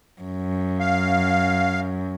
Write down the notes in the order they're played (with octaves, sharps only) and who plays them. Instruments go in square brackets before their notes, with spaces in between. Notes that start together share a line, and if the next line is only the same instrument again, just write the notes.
[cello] F#2
[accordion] F5